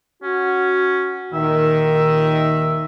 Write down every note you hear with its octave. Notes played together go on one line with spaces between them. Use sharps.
C#4 F#4
D#2 A#2 D#3 E5